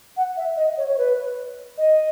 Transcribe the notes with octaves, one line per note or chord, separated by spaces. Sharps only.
F#5
E5
D#5
C#5
C#5
B4
D#5